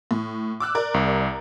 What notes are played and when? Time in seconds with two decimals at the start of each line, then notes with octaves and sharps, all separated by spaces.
0.11 A2
0.60 D6 E6 F#6
0.75 A#4 D5
0.94 C2